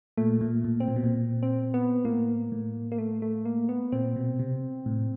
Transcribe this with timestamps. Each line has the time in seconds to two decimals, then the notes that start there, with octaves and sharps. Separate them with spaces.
0.17 A#2 A3
0.41 A#2
0.64 A#2
0.80 C4
0.88 A#2
0.96 B2
1.04 A#2
1.43 C4
1.74 B3
2.05 A2 A#3
2.52 A2
2.92 A#3
2.98 A3
3.22 A3
3.45 A#3
3.69 B3
3.92 A#2 C4
4.16 B2
4.39 C3
4.86 A2